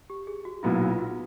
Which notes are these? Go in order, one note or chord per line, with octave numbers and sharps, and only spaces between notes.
G4
G#4
F#4
B1 A#2 F#3 B3 E4 F4
F4
F4
F#4